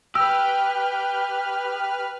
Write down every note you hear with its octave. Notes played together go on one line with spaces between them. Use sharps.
G4 B4 E6 F6